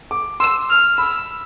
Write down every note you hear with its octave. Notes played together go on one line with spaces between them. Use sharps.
D6
C6 E6
F6
B5 E6